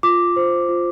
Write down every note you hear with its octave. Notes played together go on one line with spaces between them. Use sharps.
F4 D6
C5
F4